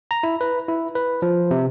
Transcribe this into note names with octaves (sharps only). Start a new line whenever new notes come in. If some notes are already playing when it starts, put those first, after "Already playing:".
A#5
E4
B4
E4
B4
F3
C3